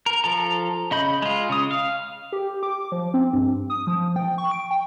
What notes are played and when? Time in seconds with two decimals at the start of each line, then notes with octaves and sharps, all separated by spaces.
0.06 A#4
0.24 F3 A4 A#5
0.91 C#3 D#5 B5 G6
1.22 G#3 F4
1.49 C#3 D#6
1.71 F5
2.32 G4
2.63 D6
2.92 F3
3.14 C4
3.33 G2
3.70 D#6
3.87 F3
4.16 G5
4.38 C#6
4.51 D7
4.70 G5